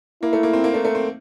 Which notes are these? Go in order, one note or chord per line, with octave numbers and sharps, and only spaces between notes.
A#3 E4
A3
A#3
C4
A#3
A3
A3
C4